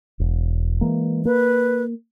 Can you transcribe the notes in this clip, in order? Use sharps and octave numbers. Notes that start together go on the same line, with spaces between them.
E1
E3 G#3 A#3
A#3 B4